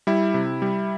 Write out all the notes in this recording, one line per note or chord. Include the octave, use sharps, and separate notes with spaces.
G3 E4
C3
G3